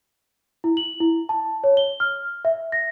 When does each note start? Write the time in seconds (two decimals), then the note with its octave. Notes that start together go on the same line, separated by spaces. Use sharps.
0.64 E4
0.77 F#7
1.00 E4
1.29 A5
1.64 C#5
1.77 G7
2.00 F6
2.45 E5
2.72 A#6